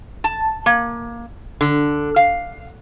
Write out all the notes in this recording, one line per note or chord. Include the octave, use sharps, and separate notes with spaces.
A5
A#3
D3
F5